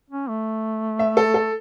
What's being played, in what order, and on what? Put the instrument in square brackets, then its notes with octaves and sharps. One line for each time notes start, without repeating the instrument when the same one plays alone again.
[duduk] C#4
A3
[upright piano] E5
A4
A4